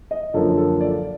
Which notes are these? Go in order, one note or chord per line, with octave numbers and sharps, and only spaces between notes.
D#5
F#2 D3 F3 A#3 A4
A4
D5